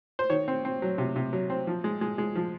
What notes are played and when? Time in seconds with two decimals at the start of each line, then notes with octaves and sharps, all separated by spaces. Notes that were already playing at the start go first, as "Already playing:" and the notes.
0.19 C5
0.30 D#3 C#5
0.48 C4
0.65 C4
0.82 F#3
0.98 C3
1.16 C3
1.33 F#3
1.50 C4
1.67 F3
1.84 G#3
2.01 G#3
2.18 G#3
2.35 F3